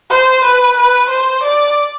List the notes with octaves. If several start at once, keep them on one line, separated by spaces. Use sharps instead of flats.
C5
B4
B4
C5
D5